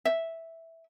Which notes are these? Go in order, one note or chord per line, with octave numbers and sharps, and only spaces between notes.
E5